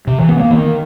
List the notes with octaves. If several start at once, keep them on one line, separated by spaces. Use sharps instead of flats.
C3
E3
B3
A#3
D#3